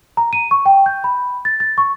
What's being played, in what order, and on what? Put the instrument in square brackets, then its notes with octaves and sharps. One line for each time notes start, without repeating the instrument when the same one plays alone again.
[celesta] A#5
D#7
C#6
G5
G6
B5
A6
A6
C#6